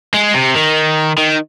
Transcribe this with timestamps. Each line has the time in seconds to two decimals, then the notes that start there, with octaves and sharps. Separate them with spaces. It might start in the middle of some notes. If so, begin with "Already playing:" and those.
0.14 G#3
0.34 C3
0.55 D#3
1.18 D#3